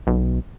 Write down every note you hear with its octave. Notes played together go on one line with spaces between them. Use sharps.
B1